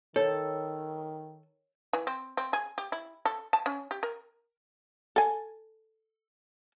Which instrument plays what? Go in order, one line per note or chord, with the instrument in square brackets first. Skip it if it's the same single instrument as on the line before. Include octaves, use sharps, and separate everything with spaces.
[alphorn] D#3 [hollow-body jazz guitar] A4 [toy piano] C#5
[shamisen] E3
C4
C4
G#4
G4
E4
A4
A5
C#4
G4
A#4
A4 G#5